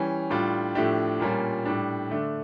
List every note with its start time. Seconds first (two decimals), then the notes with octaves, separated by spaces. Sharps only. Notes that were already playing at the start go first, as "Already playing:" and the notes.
Already playing: E3 G3 C#4
0.30 A2 G3 D4 F4
0.75 A2 F3 A3 D4 G4
1.20 A#2 G3 A#3 C#4 F4
1.65 A2 G3 D4
2.10 D3 A3 D4